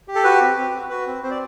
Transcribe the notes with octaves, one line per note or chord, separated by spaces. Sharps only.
G4
A4
F#4 B4
C4
C4
F#4
F#4 B4
C4
C4 C5
D5